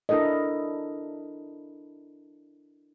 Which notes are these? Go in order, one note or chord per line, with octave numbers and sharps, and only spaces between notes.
D4 E4 A4 A#4 D#5